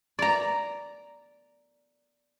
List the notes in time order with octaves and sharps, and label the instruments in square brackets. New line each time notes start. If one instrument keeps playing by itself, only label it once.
[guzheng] D5 A#5